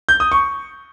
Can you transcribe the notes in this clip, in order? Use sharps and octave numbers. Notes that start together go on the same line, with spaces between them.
G6
D#6
C#6